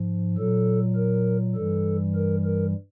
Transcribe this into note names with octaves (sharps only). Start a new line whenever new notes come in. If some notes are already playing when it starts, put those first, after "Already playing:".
Already playing: G#2 F3
A#2 F#3 A4
A#4
G2 E3 G3 A4
A#4
A#4